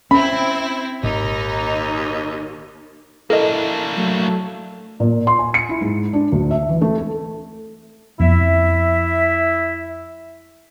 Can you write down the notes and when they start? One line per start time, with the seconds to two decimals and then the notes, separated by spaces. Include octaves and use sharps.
0.11 C4 C#4 E4 B5
1.03 G#1 D#2 A#2 D#4
3.30 A#3 D4 E4 A4 A#4 D#5
3.96 F#3 A3
5.00 A#2
5.27 C6
5.39 G#5
5.54 C#7
5.69 E4
5.81 G#2
6.13 D4
6.32 D2
6.51 E5
6.69 E3
6.82 A3
6.98 A4
8.20 F2 F3 B3 E4 E5